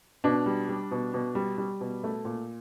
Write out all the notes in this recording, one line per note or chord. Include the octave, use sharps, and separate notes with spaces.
B2 D4
G3
G3
B2
B2
G3
G3
B2
A3
A#2